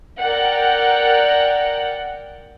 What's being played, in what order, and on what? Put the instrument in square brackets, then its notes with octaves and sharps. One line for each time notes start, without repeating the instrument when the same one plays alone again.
[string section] A#4 D5 F#5 G5